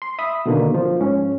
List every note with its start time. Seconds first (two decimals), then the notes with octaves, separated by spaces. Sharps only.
0.02 C6
0.19 E5 B5 D#6
0.46 B2 D3 D#3 A#3
0.74 F3
1.00 G#2 C#4